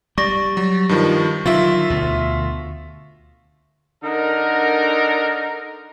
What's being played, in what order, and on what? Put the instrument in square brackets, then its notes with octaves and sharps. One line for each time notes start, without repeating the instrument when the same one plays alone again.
[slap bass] G3 [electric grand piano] D5 [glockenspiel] C#6 A#6
[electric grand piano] F#3
G2 D#3 F3
[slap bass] D3 D#3 F#3 [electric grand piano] F4 E5
[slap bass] D2 B2
[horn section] D3 D#4 A#4